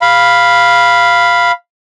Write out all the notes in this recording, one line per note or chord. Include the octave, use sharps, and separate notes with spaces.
F5 B5